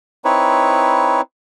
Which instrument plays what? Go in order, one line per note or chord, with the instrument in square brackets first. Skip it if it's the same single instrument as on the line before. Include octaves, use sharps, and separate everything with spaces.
[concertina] C4 D#4 E4 B4 C#5